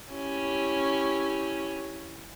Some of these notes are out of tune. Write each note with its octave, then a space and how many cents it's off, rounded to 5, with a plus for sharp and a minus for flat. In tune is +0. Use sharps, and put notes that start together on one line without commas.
C#4 +0 E4 +0 G4 +0